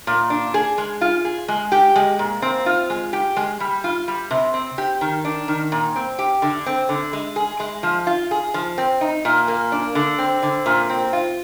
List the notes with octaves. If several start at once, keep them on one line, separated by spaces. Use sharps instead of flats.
A#2
D4
G#4
G#3
F4
G#4
G#3
G4
G#3
A#2
C4
F4
G#3
G4
G#3
G3
F4
G3
C3
C4
G4
D#3
D4
D#3
A#2
C4
G4
D3
C4
D3
G#3
G#4
G#3
F3
F4
G#4
F3
C4
D#4
A#2
A#3
D4
D3
C4
D3
A#2
C4
F4